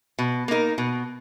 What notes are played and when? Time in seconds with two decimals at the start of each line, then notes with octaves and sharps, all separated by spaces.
0.19 B2
0.48 A#3 D#4 A#4
0.78 B2